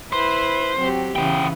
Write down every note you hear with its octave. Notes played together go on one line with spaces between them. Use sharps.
E4 B4 C5
F#3 C4 G4
C#3 E3 B3 G5